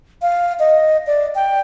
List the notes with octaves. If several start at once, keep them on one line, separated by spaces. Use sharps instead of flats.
F5
D#5
D5
G5